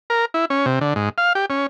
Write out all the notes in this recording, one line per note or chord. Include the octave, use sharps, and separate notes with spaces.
A#4
E4
C#4
C3
D3
G#2
F5
G4
C#4